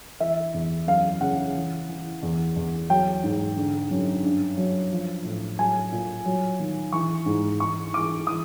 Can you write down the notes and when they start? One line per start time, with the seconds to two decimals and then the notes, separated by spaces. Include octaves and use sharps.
0.20 E3 E5
0.54 E2
0.87 F#2 F5
1.21 C#3 F#5
1.55 E3
1.89 E3
2.23 E2
2.56 E2
2.89 F#3 G5
3.24 G#2
3.56 D3
3.91 F#2
4.24 G2
4.57 F#3
4.91 F3
5.25 A2
5.59 F#3 G#5
5.92 A#2
6.25 F#3
6.60 D#3
6.92 E3 C#6
7.26 G#2
7.60 E3 C#6
7.93 E3 D6
8.27 E3 D#6